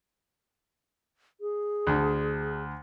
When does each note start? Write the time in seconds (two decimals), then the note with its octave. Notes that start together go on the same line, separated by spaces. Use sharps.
1.41 G#4
1.87 D2 D4